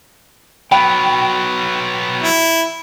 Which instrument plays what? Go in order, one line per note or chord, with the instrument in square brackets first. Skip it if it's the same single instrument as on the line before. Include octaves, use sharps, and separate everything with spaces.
[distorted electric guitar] F#3 B3 [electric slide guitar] G5 [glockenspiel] B5
[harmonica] E4